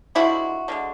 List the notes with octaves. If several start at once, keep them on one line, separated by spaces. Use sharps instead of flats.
D3 F3 G#3 E4 F#4
D3 F3 G#3